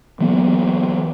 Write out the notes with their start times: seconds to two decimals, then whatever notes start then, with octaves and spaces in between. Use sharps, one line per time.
0.20 E3 F#3 A#3 B3